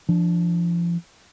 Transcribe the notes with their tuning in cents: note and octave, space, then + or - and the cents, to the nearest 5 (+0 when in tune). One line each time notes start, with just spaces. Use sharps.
F3 -30 D4 +0